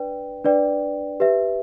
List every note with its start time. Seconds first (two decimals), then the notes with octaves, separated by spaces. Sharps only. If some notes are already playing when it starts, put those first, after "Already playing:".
Already playing: D4 B4 D5 G5
0.44 D4 B4 D5 G5
1.20 G4 B4 E5